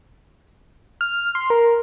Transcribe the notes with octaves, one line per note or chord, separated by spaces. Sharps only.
F6
C6
A#4